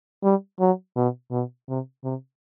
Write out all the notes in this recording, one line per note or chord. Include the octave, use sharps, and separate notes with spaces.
G3
F#3
B2
B2
C3
C3